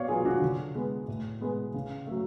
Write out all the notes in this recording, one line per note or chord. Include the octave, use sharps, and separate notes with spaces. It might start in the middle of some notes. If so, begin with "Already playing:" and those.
Already playing: B2 C#5 D5 F5
F#3 B3 F4 G#4
D4 F#4
D3
G#3 B3
A2
G#3 B3
C#3
F#3 A3